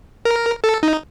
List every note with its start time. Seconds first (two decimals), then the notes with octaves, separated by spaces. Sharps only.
0.25 A#4
0.64 A4
0.83 D#4